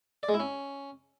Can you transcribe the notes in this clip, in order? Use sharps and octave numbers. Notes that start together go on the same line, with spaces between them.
D5
G#3
E4
C#4